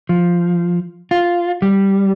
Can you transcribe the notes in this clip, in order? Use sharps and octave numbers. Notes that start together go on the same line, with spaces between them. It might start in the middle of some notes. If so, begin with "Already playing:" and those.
F3
F4
G3